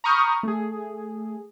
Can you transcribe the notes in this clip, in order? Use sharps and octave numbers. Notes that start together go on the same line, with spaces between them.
A#5 B5 C#6 D#6 F6 G6
A3 G#4